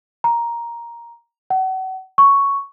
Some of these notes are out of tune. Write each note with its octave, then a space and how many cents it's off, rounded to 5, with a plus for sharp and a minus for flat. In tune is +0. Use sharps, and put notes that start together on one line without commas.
A#5 +10
F#5 +35
C#6 +5